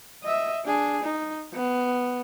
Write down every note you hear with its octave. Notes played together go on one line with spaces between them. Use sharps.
D#5 E5
D4 G#4
D#4
B3